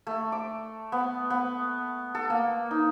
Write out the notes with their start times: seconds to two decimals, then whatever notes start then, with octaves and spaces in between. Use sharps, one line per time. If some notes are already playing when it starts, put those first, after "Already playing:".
0.07 A3
0.32 D6
0.92 B3
1.30 B3
2.15 A4
2.30 A#3
2.71 D#4